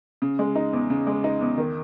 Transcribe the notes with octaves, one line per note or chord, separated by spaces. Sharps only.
C#3
G#3
D#4
E2
C#3
G#3
D#4
E2
D#3